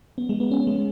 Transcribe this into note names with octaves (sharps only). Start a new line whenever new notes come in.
B3
G#3
B3
C#4
G#3